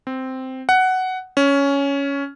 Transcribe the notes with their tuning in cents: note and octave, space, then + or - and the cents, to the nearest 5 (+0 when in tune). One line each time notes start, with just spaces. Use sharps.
C4 -5
F#5 +10
C#4 +10